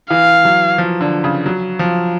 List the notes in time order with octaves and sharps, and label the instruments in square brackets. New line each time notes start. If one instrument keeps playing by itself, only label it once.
[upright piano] E3 [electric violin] F5
[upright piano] F#3
F3
D3
C#3
F#3
F3